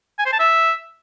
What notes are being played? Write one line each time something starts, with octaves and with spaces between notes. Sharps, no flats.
G#5
C5
A5
E5